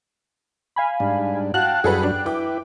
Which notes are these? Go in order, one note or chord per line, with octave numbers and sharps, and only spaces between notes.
F5 G#5 B5
G#2 G3 D4
F#4 F5 G5 A5 F#6
F#2 G3 F#4 G#4 A4 B4
D4
E4 B4 G5 D6